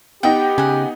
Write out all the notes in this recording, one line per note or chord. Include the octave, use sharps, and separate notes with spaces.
B3 D#4 G4 G5
C#3 F#5 G#5